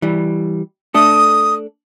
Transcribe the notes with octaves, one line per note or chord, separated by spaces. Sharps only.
E3 G3
A3 D4 A4 D#6